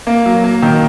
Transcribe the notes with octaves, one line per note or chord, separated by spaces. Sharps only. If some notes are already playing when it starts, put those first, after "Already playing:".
A#3
F#3
A#3
D#3